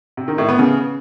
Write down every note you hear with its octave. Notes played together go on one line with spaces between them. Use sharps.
C3
D#3
A2
B3
C#3